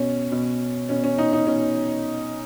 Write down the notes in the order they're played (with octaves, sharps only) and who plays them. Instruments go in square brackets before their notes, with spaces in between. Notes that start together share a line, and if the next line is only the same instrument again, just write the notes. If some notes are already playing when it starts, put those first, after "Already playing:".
Already playing: [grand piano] B2 C#4
B2
B2 C#4
C#4
D#4
D#4
B2 C#4